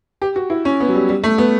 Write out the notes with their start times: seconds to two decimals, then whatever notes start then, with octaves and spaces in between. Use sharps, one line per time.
0.22 G4
0.36 F#4
0.50 E4
0.65 C#4
0.80 B3
0.89 F#3
0.95 G3
1.09 G3
1.24 A3
1.38 B3